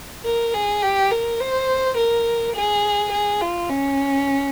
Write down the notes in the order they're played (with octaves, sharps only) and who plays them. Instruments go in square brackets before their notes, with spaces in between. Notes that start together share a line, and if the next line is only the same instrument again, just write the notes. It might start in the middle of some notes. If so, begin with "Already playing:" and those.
[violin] A#4
G#4
G4
A#4
C5
A#4
G#4
G#4
F4
C#4